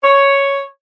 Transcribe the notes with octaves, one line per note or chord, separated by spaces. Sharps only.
C#5